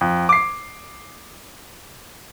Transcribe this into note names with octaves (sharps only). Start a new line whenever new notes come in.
F2
D6 C7